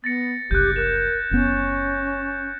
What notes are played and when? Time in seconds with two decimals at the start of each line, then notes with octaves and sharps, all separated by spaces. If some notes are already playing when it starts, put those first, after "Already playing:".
0.04 B3 A6 A#6 C#7
0.51 F#1 C2 G4 F#6 G6
0.76 A#4 F#6 E7
1.31 F#1 B3 C#4